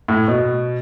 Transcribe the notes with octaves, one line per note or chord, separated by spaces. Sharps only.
A2
B2